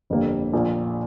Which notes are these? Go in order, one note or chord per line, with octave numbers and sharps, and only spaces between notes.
G1 F2 D3 G3 A#3
A#1 A#2 F3 A#3